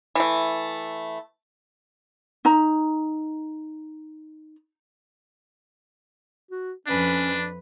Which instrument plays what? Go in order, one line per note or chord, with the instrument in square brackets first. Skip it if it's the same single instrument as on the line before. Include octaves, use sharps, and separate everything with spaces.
[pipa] E3 A3
[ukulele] D#4 A#5
[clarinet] F#4
[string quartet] F2 B4 [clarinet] C#4 [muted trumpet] D4